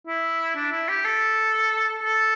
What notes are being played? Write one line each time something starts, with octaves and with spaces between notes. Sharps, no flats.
E4
D4
E4
G4
A4
A4